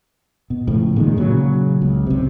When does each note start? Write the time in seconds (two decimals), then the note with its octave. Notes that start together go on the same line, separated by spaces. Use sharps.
0.50 B2
0.67 A2 C#3 F3
0.96 A#2 D#3 G#3
1.17 A#2 C#3 E3 F#3
1.82 C#2
2.07 B1 C3